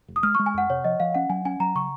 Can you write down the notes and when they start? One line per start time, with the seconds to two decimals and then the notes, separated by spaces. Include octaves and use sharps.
0.08 F1
0.16 D#6
0.23 G#3 F6
0.35 C#6
0.39 G#3
0.46 G#5
0.54 F2 F#5
0.70 C3 C#5
0.84 F3 D#5
1.00 F3 F5
1.14 C#4 F#5
1.29 F#3 G#5
1.45 C#4 G#5
1.60 F#3 A#5
1.75 C#3 C#6